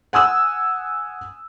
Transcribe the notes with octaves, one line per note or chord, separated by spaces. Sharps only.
F#5 G#5 D#6 E6